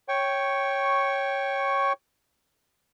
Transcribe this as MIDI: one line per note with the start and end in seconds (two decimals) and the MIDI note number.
0.08 1.93 73
0.08 1.93 79
0.08 1.93 85